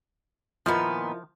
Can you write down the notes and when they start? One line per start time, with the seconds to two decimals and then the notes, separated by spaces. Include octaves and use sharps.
0.66 A#2 D#3 F3 B3 E4 F4 A#4